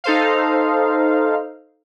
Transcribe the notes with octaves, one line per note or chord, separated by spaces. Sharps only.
D#4 A4 C5 F5